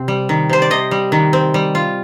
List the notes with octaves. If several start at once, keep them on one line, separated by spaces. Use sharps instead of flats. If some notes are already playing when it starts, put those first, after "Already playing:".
Already playing: C3 C4
G3
D#3
C3 C5
D5
C3 D#5
G3
D#3
C4
G3
F4